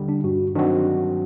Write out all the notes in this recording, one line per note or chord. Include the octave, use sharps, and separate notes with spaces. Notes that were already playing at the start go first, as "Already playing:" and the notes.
Already playing: D#2 D3 G3
D4
G2 F#4
D#3 F#3 C4 D4 F#4